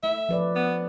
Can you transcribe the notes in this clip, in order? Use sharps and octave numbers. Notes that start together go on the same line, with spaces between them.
A3 E5
F3 B4 D5
B3